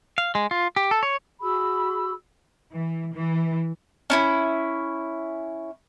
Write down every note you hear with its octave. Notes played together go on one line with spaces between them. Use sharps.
F5
G#3
F4
G4
A4
C#5
F#4 G#4 B5 E6
E3
E3
C#4 D4 E4